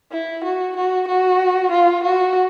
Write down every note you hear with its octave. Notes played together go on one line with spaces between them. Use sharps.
E4
F#4
F#4
F#4
F4
F#4